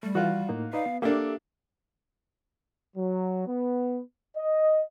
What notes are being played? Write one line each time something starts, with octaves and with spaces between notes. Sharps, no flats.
G3 A3
E3 F4 F#4
A2 A#3 D#4
D#4 B4 D5 F5
B3
A#3 D4 G4 A4 E5 D6
F#3
B3
D#5